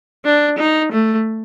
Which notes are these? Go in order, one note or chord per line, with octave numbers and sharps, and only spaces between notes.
D4
D#4
A3